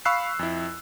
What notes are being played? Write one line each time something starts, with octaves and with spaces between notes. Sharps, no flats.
F5 B5 C#6 E6 F#6 C7
F2 E4